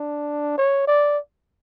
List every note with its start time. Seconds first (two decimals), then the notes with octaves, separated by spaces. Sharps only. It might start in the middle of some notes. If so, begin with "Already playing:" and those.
Already playing: D4
0.57 C#5
0.87 D5